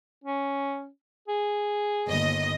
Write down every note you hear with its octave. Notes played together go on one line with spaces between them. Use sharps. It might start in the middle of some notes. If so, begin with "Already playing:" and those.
C#4
G#4
G1 D#2 D#5